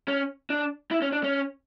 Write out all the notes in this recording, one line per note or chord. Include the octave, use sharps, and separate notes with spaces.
C#4
D4
E4
C#4
D4
C#4